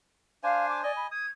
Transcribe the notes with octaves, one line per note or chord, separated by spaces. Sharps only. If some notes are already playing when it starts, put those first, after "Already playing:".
D4 C5 F5 G#5
D6
D5 D#5 G#5
B5
D#6 G#6